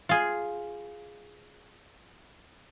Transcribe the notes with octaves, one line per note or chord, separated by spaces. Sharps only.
F4 G#4